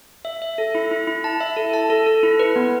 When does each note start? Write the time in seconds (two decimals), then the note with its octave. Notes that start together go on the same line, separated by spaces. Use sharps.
0.25 E5
0.42 E5
0.58 A4
0.75 E4
0.91 E4
1.07 E4
1.24 A5
1.40 E5
1.57 A4
1.74 A5
1.90 A4
2.06 A4
2.23 E4
2.39 B4
2.56 B3